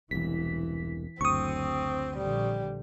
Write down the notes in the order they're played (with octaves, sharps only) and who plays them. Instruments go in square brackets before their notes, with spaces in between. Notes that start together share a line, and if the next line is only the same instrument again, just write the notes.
[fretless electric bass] E1 C2 [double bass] E3 [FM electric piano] B6
[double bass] F#1 [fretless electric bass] D2 [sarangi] C4 [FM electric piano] C#6 D#6
[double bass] A#1 D3 [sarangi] G3